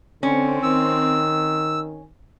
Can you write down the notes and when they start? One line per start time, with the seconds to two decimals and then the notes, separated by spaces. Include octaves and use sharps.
0.23 D3 C4 C#4
0.63 D#3 E6